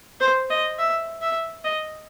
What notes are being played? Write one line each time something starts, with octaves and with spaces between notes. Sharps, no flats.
C5
D#5
E5
E5
D#5